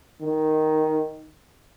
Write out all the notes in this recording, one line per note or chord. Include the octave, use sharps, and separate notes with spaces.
D#3